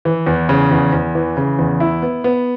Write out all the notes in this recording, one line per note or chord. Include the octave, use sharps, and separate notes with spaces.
E3
E2
C#3
E2
E2
E3
C#3
E2
E4
B3
B3